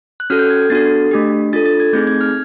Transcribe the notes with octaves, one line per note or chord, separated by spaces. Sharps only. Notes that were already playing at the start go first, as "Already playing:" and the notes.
F#6
C#4 F#4 A4 F6
G6
G#6
B3 D4 F#4 A4 A6
A3 D4 G4
D4 F4 A4 A6
A6
G#6
A3 C4 D#4 G#4 G6
G#6
F6